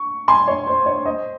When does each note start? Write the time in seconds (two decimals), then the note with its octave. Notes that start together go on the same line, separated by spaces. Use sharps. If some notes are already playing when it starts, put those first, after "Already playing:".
Already playing: C#6
0.28 G#5 C6
0.48 C#5
0.67 C5
0.86 C#5
1.05 C5 D#5